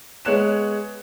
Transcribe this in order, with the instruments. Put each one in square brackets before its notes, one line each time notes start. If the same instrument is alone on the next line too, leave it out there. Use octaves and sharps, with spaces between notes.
[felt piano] G#3 B3 C#5 F#6 E7